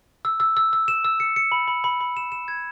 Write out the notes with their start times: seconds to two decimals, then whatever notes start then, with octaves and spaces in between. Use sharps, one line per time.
0.25 E6
0.40 E6
0.57 E6
0.73 E6
0.88 E7
1.05 E6
1.20 C#7
1.36 C#7
1.52 B5
1.68 B5
1.84 B5
2.01 B5
2.17 E7
2.32 E7
2.48 G#6